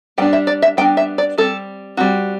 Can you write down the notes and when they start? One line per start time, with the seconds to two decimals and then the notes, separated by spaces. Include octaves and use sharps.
0.18 G3 B3 D4 G5
0.33 E5
0.47 D5
0.62 E5
0.77 G3 B3 D4 G5
0.97 E5
1.18 D5
1.38 G3 C4 A4
1.97 G3 C4 F#4